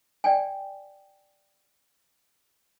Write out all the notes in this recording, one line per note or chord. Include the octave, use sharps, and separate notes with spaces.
D5 G5 G#5